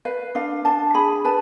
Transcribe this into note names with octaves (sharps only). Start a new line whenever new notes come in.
B4 F5
D4 F5
D4 A5
G#4 B5
B4 A5